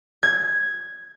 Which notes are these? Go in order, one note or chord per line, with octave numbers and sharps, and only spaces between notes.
G#6